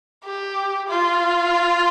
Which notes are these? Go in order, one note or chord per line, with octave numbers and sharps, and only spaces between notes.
G4
F4